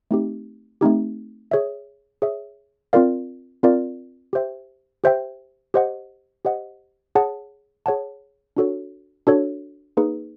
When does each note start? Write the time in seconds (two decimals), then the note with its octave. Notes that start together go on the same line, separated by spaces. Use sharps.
0.11 A3 C4 D#4 G4
0.81 A3 C4 D#4 G4
1.51 G#4 C#5 E5
2.22 G#4 C#5 E5
2.93 C4 F4 A#4 D5 F5
3.63 C4 F4 A#4 D5 F5
4.33 G4 C5 E5 G5
5.04 G4 C5 E5 G5
5.74 G4 C5 D#5 F#5
6.45 G4 C5 D#5 F#5
7.15 G#4 C#5 F#5 A5
7.86 G#4 C#5 F#5 A5
8.57 D4 F#4 A4 C#5
9.27 D4 F#4 A4 C#5
9.97 A#3 D#4 G#4 B4